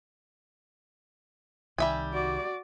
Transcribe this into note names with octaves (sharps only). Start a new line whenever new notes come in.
C2 D#3 G3 E5 G#5
F#4 D5